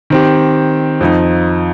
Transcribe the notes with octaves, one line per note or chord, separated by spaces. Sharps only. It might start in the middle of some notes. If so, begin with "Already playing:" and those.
D#3 C4 G4
F2 F3 D#4